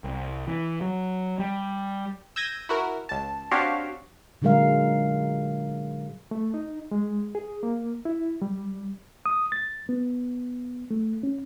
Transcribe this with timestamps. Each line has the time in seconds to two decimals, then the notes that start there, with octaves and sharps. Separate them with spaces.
0.04 C2
0.47 E3
0.81 F#3
1.39 G3
2.36 E6 G6 G#6 A#6 D#7
2.69 E4 F#4 A#4
3.09 C#2 A5
3.51 C4 D4 F#4 G4 C#5 F5
4.42 A#2 D3 F#3 G#3 A#4 F5
6.31 A3
6.54 D#4
6.91 G#3
7.35 G#4
7.63 A#3
8.05 E4
8.42 G3
9.26 D#6
9.52 A6
9.89 B3
10.91 A3
11.23 C#4